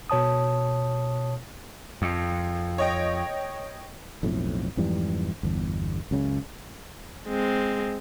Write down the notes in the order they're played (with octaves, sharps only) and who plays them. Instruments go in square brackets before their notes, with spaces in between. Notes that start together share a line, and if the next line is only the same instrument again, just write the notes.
[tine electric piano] B2 C#5 A5 D#6
[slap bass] F2
[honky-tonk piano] C#5 D#5 G5
[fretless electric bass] B1 F2 A2
F2 G#2 E3 G3
G1 E2
C#2 F#2 C#3
[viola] G#3 C4